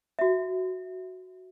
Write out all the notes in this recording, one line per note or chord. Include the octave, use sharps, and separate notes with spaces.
F#4 E5